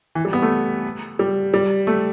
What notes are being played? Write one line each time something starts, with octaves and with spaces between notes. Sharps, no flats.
E3
G3
B3
A3
G3
G3
A3